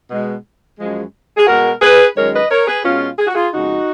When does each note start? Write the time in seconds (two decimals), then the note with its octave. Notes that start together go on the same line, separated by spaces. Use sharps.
0.11 B2 G#3
0.78 F#2 F3 G#3
1.37 G#4
1.47 B2 G#3 F#4 A#4
1.81 G#4 B4
2.16 F#2 D#3 G#3 A#4 C#5
2.33 B4 D#5
2.50 A#4 C#5
2.67 G#4 B4
2.84 B2 G#3 C#4 F4
3.19 G#4
3.26 F#4
3.34 F4 G#4
3.53 F2 C#3 G#3 D#4 F#4